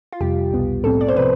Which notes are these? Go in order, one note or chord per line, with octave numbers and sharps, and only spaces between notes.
F4
F2 C3 G3 G4
C2 B2 B3
A2 F3 C4 A4
D5
C5
C3 F3 C4 B4